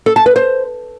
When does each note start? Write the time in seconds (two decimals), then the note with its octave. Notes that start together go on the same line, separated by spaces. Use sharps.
0.06 A4
0.16 A5
0.26 B4
0.36 C5